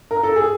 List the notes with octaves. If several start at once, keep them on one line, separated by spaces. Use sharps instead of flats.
A#4
A4
G#4